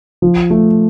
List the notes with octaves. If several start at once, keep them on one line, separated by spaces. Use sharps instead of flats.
F3
A3